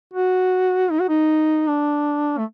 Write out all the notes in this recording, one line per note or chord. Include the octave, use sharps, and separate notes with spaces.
F#4
D#4
F#4
D#4
D4
A3